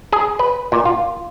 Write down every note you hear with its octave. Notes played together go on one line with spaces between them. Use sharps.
G#4
B4
A#2
F4